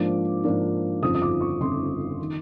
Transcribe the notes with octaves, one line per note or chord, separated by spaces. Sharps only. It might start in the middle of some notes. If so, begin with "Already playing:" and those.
Already playing: G#2 F3 A#3 D4 D6
G#2 F3 A#3 D4
G1 F2 C#3 F3 D#6
D#6
D6
C#6
G1 F2 C#3 F3 C6
D#3